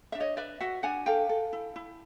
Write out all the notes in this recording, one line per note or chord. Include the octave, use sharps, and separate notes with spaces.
D4 E5
C#5 D#5
B4 D5 E5
F#4 E5 F#5
D4 F#5 G#5
A4 F5 G5
A4
E4
E4